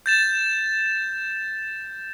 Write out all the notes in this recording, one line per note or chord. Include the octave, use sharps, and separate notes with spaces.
G6 A6 E7